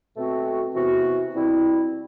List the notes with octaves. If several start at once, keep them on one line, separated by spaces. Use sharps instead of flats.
B2 A3 C4 F#4
C3 E3 B3 F#4
B2 G3 C4 E4